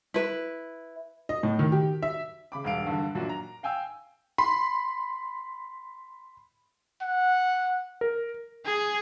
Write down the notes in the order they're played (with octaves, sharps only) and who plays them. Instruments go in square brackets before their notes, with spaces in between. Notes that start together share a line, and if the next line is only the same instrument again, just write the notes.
[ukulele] E4 B4
[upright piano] D#5
A2
D#3
G4
E5
C#3 B5 D6
E1 G2 F5 D7
G2 D3
F#2 A#2 D4 F#4
A#5
F5 G5 G#5 E6
[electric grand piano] B5 C6
[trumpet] F#5
[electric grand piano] A#4
[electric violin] G#4